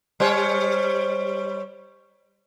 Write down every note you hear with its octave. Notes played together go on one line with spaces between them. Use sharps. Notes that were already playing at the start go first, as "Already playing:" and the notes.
G3 C5 C#5